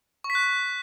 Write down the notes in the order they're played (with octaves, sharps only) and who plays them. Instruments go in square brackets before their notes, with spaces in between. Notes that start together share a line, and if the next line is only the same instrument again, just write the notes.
[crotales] C#6
B6
F#6